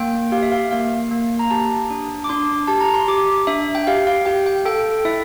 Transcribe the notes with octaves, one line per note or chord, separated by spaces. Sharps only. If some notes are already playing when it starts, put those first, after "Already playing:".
Already playing: A#3 G5
G4 F5
E5
F5
A#3 F5
A#3
A#5
G4 A5
D4
D6
D4 C6
G4 A5
A#5
C6
G4 D6
D4 E5
G5
G4 F5
F5
G4 G5
G5
A4 G5
E4 E5